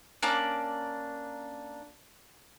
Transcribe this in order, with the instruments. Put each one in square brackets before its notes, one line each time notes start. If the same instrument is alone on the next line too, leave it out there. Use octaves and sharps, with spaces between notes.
[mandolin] A#3 C#4 D4 D6